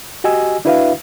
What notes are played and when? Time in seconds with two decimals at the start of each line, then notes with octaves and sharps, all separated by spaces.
0.24 F#4 G4 D#5 G#5 E6
0.65 D4 E4 F#4 B4 E5 F5